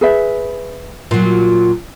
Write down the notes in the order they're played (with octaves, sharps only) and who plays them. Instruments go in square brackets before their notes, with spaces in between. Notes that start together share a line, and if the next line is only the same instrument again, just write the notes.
[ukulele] G#4 B4 E5
[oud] A#2 F#3